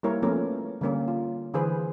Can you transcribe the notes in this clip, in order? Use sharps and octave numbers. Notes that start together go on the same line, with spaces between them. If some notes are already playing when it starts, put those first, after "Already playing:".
G3 A#3 E4 A#4 C#5
F3 A3 B3 C#4 F4 A#4
D3 G3 A#3 C#4
F4
D3 E3 G#4 B4 C5